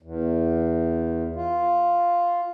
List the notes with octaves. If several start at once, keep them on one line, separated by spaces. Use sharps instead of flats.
E2
F4